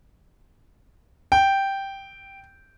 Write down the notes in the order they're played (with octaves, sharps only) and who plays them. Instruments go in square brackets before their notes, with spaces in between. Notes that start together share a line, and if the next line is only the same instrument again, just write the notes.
[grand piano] G5